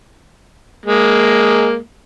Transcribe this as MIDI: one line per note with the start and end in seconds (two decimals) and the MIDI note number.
0.86 1.77 56
0.86 1.77 58